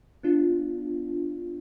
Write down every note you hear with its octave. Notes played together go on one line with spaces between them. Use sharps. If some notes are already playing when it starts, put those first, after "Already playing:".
B3 D4 F4